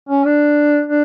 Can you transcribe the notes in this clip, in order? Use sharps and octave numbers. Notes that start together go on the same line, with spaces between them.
C#4
D4
D4